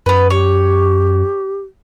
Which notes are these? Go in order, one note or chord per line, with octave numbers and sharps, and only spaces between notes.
F#2 B3 B4
G4 C#5